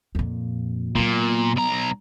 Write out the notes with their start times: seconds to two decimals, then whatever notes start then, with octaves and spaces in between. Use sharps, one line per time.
0.15 F2 A#2
0.95 A#2 F#3 B3
1.56 B1 A#5